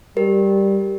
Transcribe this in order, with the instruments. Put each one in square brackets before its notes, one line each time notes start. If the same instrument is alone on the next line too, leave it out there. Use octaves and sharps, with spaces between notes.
[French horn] G3 [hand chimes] G4 A#4